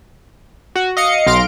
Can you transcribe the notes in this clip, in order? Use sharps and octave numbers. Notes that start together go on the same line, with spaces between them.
F#4
D#5 F5 C#7
B1 F5 C6 A#6 D7